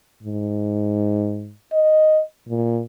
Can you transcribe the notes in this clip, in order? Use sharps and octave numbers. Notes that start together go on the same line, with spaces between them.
G#2
D#5
A#2